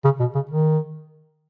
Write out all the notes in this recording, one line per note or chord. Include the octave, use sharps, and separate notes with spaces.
C#3
B2
C#3
D#3